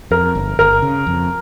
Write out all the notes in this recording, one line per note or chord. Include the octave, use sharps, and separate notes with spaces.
F2 A#4
G1
G1 A#4
C#3
F2